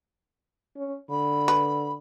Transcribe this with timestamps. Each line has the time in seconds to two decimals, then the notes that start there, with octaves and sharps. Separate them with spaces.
0.76 C#4
1.09 D3 B5
1.48 B4